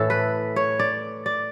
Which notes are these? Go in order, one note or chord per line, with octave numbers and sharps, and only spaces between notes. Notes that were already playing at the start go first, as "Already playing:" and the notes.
Already playing: A2 E3 A4
B4
C#5
D5
D5